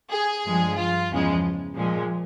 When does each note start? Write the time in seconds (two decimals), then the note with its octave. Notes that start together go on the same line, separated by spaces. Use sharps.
0.12 G#4
0.45 G2 F3 G#3
0.78 F4
1.11 E2 C#3 F3 G#3
1.77 A#2 F3 G#3